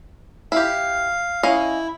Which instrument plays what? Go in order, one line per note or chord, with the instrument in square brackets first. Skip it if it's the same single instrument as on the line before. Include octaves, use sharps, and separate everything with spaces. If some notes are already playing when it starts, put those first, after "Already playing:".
[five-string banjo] E4 G4 [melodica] F5
[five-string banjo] C#4 D#5 F5 [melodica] E4